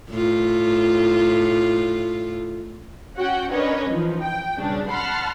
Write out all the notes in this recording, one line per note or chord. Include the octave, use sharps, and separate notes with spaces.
A2 F4
C#4 F#4 F#5 G5
C#4 D4 A#4 B4 C#5 D#5
E3 F3 D#4
G5
B1 G2 C#3 D4
F#5 A5 B5 C6 F6